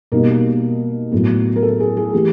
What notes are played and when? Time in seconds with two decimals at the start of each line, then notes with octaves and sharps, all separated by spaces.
0.12 B2 G3 A#3 D#4 A#4
1.12 A2 F#3 B3
1.56 A#4
1.63 A4
1.80 G#4
1.97 G#4
2.13 E3 A3 G4